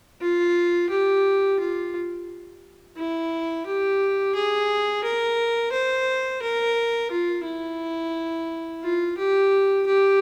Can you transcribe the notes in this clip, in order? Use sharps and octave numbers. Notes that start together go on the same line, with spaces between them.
F4
G4
F4
E4
G4
G#4
A#4
C5
A#4
F4
E4
F4
G4
G4